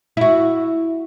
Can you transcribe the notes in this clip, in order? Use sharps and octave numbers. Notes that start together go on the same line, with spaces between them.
E4 F#4